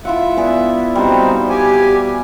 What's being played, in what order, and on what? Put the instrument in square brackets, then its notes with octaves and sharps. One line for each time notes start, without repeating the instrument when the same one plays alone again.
[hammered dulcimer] E4 F4 F#5 [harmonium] E5
[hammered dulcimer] B3 G#4 D5
[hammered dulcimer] G3 F#4 [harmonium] C4 D#4 C5
[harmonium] G4 G#5